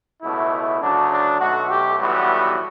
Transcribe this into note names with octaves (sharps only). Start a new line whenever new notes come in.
C#2 B2 A3 E4
D2 C#3 F#3 D4
D4
B1 B2 A3 F#4
G4
B1 A2 E3 G3 B3 F#4